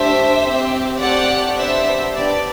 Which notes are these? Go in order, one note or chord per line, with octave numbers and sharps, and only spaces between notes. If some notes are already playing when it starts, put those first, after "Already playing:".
Already playing: A3 D4 G4 C5 E5
C4 G4
A3 C4 G4 D5 F#5
B3 D4 G4 C5 E5
B3 D4 G4 D5